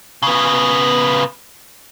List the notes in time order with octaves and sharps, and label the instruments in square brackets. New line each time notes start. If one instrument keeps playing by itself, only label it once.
[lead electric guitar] C#3 B3